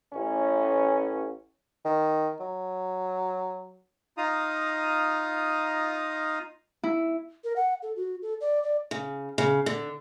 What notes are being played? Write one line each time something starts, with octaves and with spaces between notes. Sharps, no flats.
A1 C#4
D#3
F#3
D#4 F4 F5 A#5 D#6
E4
A#4
F#5
A4
F#4
A4
D5
D5
C#3
C#3
D3